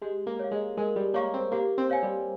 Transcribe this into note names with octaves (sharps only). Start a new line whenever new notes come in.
G#3 G4
A#3
C#5 F5
G#3
G#3 A#4
G3
A#3 C#5 F5 A#5 C#6
C4
A#3 G4
C4
C#5 F5 G#5
G3